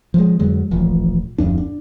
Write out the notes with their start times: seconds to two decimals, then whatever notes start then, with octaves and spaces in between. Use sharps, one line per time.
0.14 F3 G#3
0.39 F2 D3 F#3 G#3
0.71 D#1 A1 F3
1.38 D1 F2 D4
1.58 D4